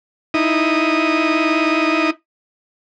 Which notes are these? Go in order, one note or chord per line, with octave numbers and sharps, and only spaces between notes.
D#4 E4 D#6